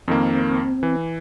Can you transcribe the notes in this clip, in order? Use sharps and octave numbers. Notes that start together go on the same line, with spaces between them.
F2 D#3 A#3 C4
E3